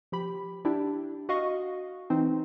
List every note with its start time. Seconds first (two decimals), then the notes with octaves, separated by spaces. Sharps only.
0.12 F3 G4 B5
0.65 D4 E4 G4
1.29 F#4 D#5 F5 C#6
2.10 E3 C4 D#4